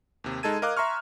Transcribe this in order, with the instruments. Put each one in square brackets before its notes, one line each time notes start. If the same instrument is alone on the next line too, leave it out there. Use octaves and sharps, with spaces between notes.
[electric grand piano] D#2 C3
G#3 D#4 A4 A5 G#6 D#7
A#4 D#5 F5 D6 F#6
E5 A#5 C6 C#6 F6